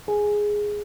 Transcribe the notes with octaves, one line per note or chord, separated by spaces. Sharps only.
G#4